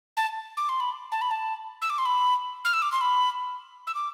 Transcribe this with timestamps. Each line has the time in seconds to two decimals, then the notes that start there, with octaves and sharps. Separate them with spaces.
0.17 A5
0.57 D6
0.69 C6
0.80 B5
1.12 A5
1.21 B5
1.31 A5
1.82 E6
1.90 D6
1.98 C6
2.05 B5
2.65 F6
2.74 E6
2.82 D6
2.92 C6
3.01 B5
3.87 E6
3.95 D6